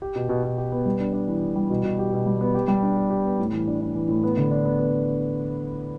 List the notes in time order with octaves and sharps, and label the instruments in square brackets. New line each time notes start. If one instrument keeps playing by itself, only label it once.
[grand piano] G4
B2
B2
B2
G4
B3
G3
D4
D4
E3
E3
G3
B2
B2
G4
B2
G3
B3
G4
G3
D4
G4
G4
B3
A2
E3
D4
D4
E3
A2
B3
D3
D4
B3
B3